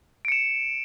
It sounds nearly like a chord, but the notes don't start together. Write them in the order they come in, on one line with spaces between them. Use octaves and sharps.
D7 C#7 E7